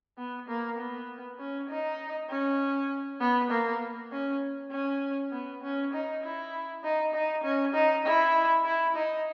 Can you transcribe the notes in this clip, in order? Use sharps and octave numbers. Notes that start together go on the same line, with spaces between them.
B3
A#3
B3
C#4
D#4
C#4
B3
A#3
C#4
C#4
B3
C#4
D#4
E4
D#4
D#4
C#4
D#4
E4
E4
D#4